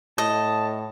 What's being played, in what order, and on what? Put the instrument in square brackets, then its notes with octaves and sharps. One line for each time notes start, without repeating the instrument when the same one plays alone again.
[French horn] A2 [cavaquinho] D#5 [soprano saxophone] A5